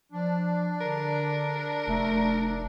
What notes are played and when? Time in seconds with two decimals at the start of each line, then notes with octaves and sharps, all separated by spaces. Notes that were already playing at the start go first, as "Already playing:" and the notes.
0.12 F3 D4
0.81 D3 A#4
1.87 F1 A3